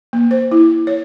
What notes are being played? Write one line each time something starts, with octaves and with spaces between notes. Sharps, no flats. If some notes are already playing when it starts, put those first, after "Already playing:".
A#3
C5
E4
C#5